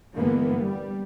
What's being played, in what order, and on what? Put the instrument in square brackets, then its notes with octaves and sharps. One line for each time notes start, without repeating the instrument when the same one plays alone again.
[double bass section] G2 D3 E3 G#3 A#3 B3
G3